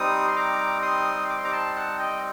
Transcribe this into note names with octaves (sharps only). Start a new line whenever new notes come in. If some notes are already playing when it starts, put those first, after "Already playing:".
Already playing: G3 C4 D#4 D#6
C6
A#5 D6
C6 D#6
D6
C6
A#5 D6
A5 C6
F#5 A5
D#5 G5